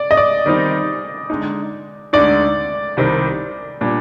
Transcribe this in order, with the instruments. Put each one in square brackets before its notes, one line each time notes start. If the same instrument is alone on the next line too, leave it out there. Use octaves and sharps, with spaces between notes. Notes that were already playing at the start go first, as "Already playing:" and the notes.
Already playing: [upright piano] D5
D#5
D5
[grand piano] D#3 G3 C4 D#4
D3 G#3 D#4
[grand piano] D2 D3 G#3 D#4 [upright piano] D5
[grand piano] C2 C3 D#3 G3 C4
A#2 G3 D4